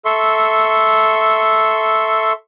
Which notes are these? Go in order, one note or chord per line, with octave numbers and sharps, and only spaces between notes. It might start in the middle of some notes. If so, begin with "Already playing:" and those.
A4 E5 C6 C#6